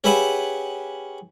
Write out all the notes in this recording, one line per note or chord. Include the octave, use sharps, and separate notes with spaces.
C#4 G4 G#4 B4 E5 F#5